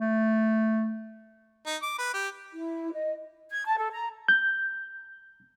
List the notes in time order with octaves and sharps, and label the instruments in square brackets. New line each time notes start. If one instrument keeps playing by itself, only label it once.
[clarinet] A3
[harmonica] D#4
D6
B4
G4
[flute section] E4
D#5
G#6
A5
A4
A#5
[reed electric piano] G6